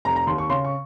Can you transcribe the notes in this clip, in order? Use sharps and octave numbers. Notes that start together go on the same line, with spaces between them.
F1 A#5
A#5
D#2 C6
C#6
C#3 C6
C#6